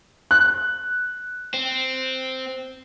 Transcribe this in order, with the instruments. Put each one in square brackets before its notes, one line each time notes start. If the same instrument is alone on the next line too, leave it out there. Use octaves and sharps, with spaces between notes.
[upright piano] F#6
[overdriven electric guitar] C4